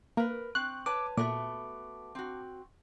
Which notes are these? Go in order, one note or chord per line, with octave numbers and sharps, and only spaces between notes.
A#3 A#4 B4
C4 C#6 F#6
B4 C#5 A5 D6
A#2 A3 B3 F#4 A5 D6
C4 F#4